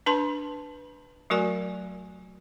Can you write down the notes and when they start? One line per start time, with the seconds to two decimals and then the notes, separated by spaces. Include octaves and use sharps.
0.06 D4 B4 A5 C6
1.30 F#3 A3 F#4 A#4 D5 G#5